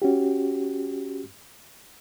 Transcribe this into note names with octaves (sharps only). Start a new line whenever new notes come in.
C#4 F#4 G4